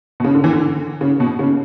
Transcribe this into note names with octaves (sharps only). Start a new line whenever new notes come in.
B2
C#3
D3
E3
D3
C#3
B2
C#3